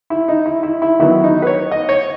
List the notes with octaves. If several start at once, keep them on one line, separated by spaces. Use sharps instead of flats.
E4
D#4
E4
E4
E4
D#3 F#3 B3 E4
D#4
B4
C#5
D#5
C#5